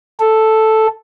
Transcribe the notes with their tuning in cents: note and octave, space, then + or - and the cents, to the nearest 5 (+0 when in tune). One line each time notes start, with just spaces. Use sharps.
A4 +0